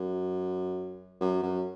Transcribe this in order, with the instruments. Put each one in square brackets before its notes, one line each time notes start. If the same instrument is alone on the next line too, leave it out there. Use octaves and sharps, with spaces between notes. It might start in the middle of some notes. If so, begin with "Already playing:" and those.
Already playing: [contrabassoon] F#2
F#2
F#2